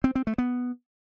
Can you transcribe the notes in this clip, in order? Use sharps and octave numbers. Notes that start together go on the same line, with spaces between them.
C4
C4
A3
B3